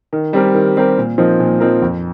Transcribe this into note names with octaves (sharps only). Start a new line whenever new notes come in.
D#3
G3 C4 G4 A#4
D#3
G3 C4 G4 A#4
A#2
F3 C4 D#4 A#4
A#2
F3 C4 D#4 A#4
F2